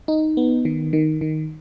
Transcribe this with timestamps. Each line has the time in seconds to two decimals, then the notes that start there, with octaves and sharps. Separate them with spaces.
0.08 D#4
0.37 B3
0.65 D#3
0.93 D#3
1.21 D#3